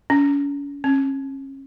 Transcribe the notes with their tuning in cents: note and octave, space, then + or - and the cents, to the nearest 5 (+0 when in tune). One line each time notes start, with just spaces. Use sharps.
C#4 +40
C#4 -35